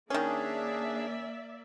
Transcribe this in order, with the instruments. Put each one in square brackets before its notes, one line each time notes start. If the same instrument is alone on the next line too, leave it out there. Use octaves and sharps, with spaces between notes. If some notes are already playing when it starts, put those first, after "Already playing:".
[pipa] D#3 C#4 [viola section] A#3 D5 E5 [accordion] D4 G#4